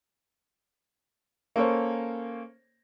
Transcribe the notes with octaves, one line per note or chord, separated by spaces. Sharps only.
A#3 C#4 A4 A#4 C5 C#5